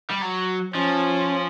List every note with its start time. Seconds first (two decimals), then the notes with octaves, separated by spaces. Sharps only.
0.10 G3
0.22 F#3
0.74 F3 C#4